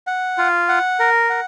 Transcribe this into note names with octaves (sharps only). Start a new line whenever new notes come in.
F#5
F4
F#5
A#4
F#5